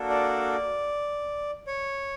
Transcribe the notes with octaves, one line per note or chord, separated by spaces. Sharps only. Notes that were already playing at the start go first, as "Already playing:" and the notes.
Already playing: A#3 D4 F#4 A4
D5
C#5